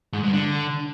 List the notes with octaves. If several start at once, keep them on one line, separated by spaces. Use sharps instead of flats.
G#2
G2
D3